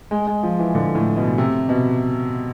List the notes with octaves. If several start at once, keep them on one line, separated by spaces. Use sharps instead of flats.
G#3
G#3
F3
E3
D3
A2
B2
C3
B2